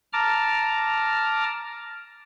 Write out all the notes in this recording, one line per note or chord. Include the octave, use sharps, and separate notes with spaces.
A5 A#5 D6 F6